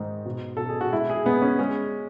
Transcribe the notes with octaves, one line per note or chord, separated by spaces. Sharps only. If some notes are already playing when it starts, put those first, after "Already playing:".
Already playing: G#2 D#3 D#4
B2
B2 A4
G#4
F#4
G#3 E4
G#4
G#3 B3
C#4
G#3 C#4